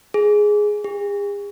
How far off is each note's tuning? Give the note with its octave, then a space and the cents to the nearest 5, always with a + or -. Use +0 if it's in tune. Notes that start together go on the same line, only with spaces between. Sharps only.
G#4 +5
G#4 -45